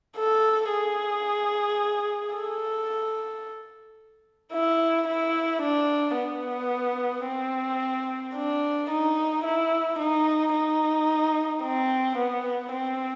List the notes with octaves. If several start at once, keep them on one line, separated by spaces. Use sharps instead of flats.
A4
G#4
A4
E4
E4
D4
B3
C4
D4
D#4
E4
D#4
D#4
C4
B3
C4